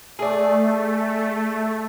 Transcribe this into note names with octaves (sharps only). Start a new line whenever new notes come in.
A3 G#4 D5